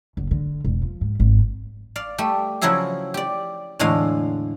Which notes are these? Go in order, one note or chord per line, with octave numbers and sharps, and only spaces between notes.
F#1
D3
E1
F3
G#2
G#1
D5 F5
G3 A3 G4
C#3 F3 F#3 E4 G#4 E5
G4 D5
E2 A2 D3 G#3 F5